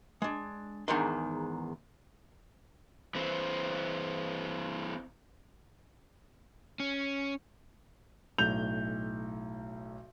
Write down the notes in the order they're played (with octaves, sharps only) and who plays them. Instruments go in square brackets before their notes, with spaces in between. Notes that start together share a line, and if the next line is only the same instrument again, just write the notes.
[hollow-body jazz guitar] G#3 D4
E2 G#2 D#3 D4 C6
[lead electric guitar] E3 C4
[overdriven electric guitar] C#4
[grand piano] B1 A2 G6 F7